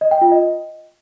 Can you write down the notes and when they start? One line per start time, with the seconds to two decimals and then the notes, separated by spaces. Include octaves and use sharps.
0.01 D#5
0.11 G5
0.21 F4
0.32 D#5